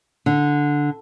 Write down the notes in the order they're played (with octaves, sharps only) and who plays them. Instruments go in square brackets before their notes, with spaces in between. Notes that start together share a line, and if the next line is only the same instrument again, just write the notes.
[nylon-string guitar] D3